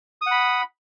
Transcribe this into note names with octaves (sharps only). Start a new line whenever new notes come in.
F#5 B5 D#6